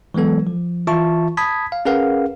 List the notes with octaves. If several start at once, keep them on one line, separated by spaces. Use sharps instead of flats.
E3 F#3 G#3 B3 A4
F3
E3 F4 E5 A5 C#6
A5 B5 D#6 G#6 B6
F5
C#4 G#4 A#4 B4 F5 F#5